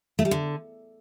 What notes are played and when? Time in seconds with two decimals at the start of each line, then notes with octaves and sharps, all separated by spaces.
0.19 A3
0.25 G3
0.31 D3